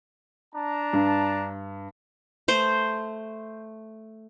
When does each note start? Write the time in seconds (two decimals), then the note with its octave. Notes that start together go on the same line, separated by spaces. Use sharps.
0.55 D4 A5 A#5
0.93 G2
2.48 A3 C5